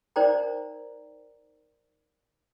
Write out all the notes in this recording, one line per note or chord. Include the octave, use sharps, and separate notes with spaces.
D#4 A#4 C5 D5 G5 A#5